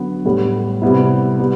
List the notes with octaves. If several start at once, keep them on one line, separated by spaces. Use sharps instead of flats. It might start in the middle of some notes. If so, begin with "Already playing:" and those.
Already playing: D3 F#3 B3
A2 G3 B3
C3 G3 B3 E4
G3 B3